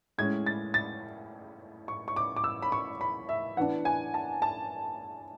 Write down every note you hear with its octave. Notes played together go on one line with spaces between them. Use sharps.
A2 G#3 C#4 G#6
A6
A6
C#6
C#6
D6
D6
E6
B5
C#6
B5
E5
E3 B3 D4 F#5
G#5
A5
A5